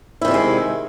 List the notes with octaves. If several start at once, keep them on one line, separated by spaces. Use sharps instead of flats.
C3 D#3 G3 G#3 E4